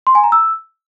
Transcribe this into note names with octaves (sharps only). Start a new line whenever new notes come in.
C6
G#5
A#5
E6